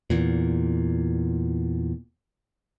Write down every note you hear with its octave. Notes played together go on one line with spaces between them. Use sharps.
E2 A#2